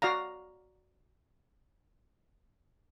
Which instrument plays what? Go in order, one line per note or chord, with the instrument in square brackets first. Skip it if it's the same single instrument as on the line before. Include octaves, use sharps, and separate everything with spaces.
[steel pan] F#4 D5 F5 A#5